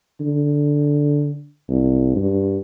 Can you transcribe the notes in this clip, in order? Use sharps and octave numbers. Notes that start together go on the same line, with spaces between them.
D3
C2
G2